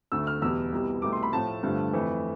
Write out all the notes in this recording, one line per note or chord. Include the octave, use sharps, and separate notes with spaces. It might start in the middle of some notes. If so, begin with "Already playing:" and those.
D2 D3 A3 E6
F6
E2 B2 G3 E6
C2 B2 G3
C2 B2 A3 D6
C6
B5
A2 F3 A3 A5
G2 D3 F3 A3
F2 E3 A3